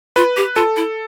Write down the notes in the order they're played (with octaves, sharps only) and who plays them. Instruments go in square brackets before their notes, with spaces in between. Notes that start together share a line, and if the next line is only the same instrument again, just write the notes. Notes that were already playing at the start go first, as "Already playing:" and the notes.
[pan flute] F4 [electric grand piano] B4
[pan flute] G4
[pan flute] F4 [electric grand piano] A4
[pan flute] E4